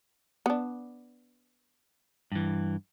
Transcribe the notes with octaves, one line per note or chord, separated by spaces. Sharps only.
B3 D4
G2 E3